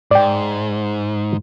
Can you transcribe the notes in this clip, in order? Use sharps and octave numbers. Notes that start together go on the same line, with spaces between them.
G#2 D5 G5